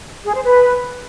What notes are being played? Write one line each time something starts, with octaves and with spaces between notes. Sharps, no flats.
G#4
C5
B4